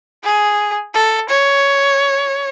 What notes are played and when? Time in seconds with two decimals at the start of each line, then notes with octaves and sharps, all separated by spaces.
0.24 G#4
0.94 A4
1.29 C#5